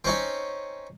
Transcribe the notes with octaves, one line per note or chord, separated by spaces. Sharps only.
C4 C#4 D#4